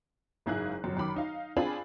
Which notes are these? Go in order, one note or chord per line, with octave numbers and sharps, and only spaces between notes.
F#1 G#2 E4 G#4 F5 F#6
G1 F#2
F#2 D#3 B5 D6
D#4 F5
C4 D4 F4 G#4 G#5 B5